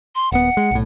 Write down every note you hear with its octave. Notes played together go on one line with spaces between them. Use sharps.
C6
D#1 B3 F#5
G#3
B1 A2